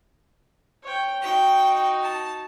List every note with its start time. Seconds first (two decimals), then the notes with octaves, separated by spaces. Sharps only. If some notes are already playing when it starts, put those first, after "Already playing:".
0.83 C#5 G5
1.22 D#4 F#4 G5
2.03 A5